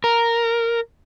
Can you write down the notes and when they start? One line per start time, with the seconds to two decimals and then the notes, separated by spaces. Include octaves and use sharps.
0.04 A#4